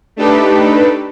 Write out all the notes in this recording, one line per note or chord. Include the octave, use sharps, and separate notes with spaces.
A3 D4 D#4 G4 A4 B4